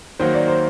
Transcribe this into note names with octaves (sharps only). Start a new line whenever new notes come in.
D#3 F#3 A#3 F#4 C5
D5
C5